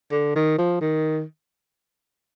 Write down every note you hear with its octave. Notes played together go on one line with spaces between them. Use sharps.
D3
D#3
F3
D#3